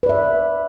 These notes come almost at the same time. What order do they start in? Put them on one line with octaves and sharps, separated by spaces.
B4 D5 E5